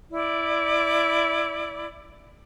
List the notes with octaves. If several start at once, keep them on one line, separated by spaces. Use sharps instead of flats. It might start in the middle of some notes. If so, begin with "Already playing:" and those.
E4 D5